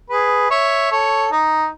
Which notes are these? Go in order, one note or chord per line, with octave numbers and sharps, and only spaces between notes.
G#4 B4
C#5 E5
A4 C#5
D#4